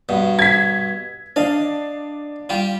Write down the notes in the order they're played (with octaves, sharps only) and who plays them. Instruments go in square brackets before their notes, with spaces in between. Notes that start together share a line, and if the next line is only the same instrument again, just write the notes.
[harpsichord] G2 B2
[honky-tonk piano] G#6 B6
[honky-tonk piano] D4 [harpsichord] D#5 F5
[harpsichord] G3 F4 G4